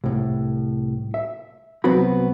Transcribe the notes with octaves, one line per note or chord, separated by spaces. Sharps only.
C2 A2
E5
C2 F#3 B3 C4 F#4 B5